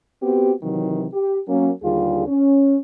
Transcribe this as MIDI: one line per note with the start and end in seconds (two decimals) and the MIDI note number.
0.23 0.52 59
0.23 0.52 60
0.23 0.52 66
0.23 0.52 67
0.63 1.05 48
0.63 1.05 51
0.63 1.05 52
0.63 1.05 54
1.14 1.39 67
1.48 1.70 54
1.48 1.70 58
1.48 1.70 61
1.82 2.27 39
1.82 2.27 50
1.82 2.27 55
1.82 2.27 65
1.82 2.27 68
2.27 2.77 61